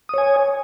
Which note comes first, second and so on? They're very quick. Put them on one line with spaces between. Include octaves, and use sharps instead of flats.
D#6 C#5 G#5